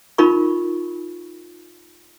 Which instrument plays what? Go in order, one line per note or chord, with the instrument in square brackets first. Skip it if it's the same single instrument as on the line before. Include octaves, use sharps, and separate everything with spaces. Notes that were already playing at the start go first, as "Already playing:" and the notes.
[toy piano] D#4 F4 A#4 B5 C#6